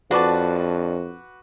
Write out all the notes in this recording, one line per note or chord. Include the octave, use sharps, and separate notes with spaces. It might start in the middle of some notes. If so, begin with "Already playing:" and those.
F2 D4 F#4 B4 A5 D6